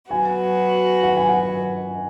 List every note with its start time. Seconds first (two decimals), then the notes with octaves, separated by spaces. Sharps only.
0.11 F#3 B3 F#4 G#5
1.03 F#5
1.17 G#5
1.29 F#5